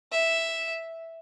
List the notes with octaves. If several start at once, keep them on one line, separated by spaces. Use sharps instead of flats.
E5